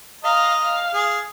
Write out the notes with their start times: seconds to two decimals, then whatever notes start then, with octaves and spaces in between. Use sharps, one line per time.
0.24 D#5 F5 A#5
0.62 F5
0.94 G#4